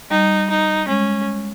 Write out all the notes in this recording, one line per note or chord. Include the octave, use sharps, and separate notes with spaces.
G3 D#4
D#4
G#3 C#4